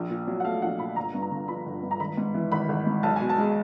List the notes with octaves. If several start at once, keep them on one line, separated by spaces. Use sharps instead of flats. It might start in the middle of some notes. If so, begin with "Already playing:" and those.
Already playing: A#1
A#2
F#3
F#5
A3 F5
A#1 F#5
A#2 B5
G1 A#5
G2
A#5
D3
F3 B5
G1
G2
A#5
G#1 B5
G#2
E3
G#1 B5
G#1
G#2
B1 A5
B2 G#5
A5
G#3